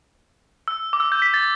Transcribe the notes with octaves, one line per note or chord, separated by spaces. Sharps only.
E6
D6
E6
G6
B6
A6